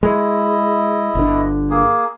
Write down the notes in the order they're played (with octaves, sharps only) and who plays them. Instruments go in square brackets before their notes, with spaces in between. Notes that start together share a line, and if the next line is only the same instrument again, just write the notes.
[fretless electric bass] G#3 [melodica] E4 D#5
[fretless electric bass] G1 D3
[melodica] A#3 G#4